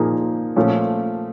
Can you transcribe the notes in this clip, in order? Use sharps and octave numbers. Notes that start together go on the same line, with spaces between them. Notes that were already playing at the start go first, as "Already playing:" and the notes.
Already playing: A#2 F3 A#3 D#4 G#4
A#2 F3 A3 C#4